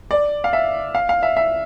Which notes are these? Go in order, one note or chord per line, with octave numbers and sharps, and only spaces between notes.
D5
F5
E5
F5
F5
E5
E5